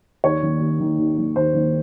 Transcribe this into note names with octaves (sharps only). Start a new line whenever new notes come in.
D#2 C#5
D#3 A#3
D#2
D#3 A#3
D#2
D#3 A#3
D#2 C5
D#3 A#3